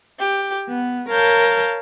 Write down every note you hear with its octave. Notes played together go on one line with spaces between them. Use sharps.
G4
B3
A#4 C#5 F5 A5 G6